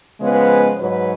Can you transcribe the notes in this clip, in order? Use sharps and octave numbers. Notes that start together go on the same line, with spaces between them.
C#3 F3 G#3 B3 B4
G#2 F#3 B4 C#5